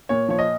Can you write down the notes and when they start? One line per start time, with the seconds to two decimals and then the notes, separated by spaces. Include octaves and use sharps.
0.09 A#2 C#5
0.28 F3 C#5
0.39 D#5